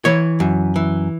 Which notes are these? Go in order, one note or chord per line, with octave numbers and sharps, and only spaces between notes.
E3 C#5
F#2
E3